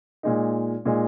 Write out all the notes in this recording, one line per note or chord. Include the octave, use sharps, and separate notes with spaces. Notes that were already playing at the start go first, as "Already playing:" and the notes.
A#2 G#3 D#4
A#2 G#3 D#4